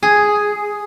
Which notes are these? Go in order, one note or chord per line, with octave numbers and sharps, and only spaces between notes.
G#4